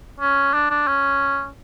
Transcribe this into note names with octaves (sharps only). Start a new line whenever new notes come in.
C#4
D4
D4
C#4